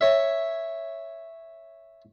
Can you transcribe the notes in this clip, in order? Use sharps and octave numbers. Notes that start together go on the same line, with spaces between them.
C#5 E5